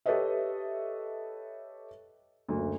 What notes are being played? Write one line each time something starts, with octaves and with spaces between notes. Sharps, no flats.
G4 A4 B4 C#5 D#5 E5
F#1 D2